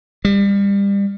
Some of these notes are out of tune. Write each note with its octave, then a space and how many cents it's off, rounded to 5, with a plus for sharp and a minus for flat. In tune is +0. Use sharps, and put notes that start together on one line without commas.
G3 +30